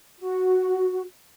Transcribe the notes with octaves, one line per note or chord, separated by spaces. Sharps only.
F#4